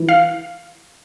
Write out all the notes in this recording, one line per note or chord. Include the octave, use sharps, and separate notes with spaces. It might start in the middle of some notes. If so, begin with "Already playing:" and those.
Already playing: E3
F5